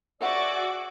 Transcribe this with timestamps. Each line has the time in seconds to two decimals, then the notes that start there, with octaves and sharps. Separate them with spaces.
0.21 F#4 G#4 C5 D5 E5 F#5 D6 E6